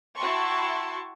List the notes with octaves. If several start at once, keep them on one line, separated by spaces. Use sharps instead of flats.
E4 F#4 G5 A5 C6 C#6